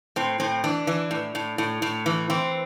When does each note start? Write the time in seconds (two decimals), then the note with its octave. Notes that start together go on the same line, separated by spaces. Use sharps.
0.16 A2 C4
0.40 A2 C4
0.64 E3 D4
0.87 E3
1.11 A2
1.35 A2
1.58 A2
1.82 A2
2.06 E3
2.30 E3 C4